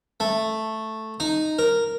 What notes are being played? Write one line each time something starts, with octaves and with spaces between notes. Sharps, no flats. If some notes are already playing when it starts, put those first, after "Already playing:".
A3
D#4
A#4